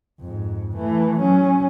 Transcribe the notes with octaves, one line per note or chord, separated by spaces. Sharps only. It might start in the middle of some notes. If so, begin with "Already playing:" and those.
F2 G#2
E3 A3
F#3 C#4